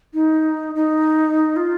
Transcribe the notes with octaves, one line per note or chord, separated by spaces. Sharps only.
D#4
D#4
F4